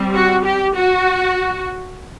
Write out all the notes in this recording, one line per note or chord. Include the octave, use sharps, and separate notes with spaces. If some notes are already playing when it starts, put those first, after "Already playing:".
Already playing: G3 C4
F#4
G4
F#4